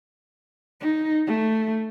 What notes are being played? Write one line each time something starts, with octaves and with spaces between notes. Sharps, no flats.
D#4
A3